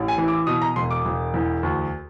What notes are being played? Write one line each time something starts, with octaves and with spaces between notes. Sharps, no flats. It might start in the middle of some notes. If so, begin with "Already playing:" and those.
Already playing: A1
G#5
E3
D6
B2 D#6
A#5
E1 C6
D6
E1
E2
D2